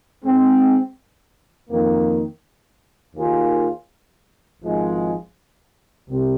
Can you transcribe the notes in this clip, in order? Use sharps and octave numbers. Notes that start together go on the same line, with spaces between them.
G#2 G#3 C4
F2 D#3 A#3
D#2 D#3 A#3 F4 G#4
G#1 G#2 F3 G#3
C2 C3